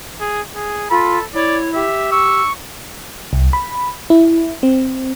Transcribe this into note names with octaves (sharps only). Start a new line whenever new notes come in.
G#4
G#4
F4 A4 B5
E4 C#5 D5
G4 E5
C#6 E6
C2
B5
E4
C4